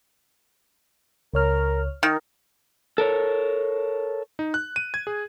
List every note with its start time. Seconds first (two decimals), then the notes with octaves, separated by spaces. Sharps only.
1.34 C#2 A#4 C#5 F6
2.03 D#3 A#4
2.98 A4 A#4 C#5
4.39 D#4
4.54 F#6
4.76 D#7
4.94 G#6
5.07 G#4